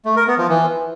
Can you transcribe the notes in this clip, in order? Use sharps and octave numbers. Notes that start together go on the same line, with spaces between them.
A3
A#4
B3
F3
E3